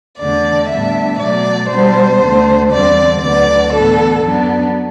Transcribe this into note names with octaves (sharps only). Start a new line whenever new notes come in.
E2 D3 A3 D4 D5
A2 G3 B3 D4 E5
B2 F#3 A3 D5
B2 G3 B3 D4 C5
D2 D3 A3 D4
E2 D3 G3 C4 D5
D2 D3 F#3 B3 D5
A2 E3 B3 D4 A4
F#2 F#3 B3 D4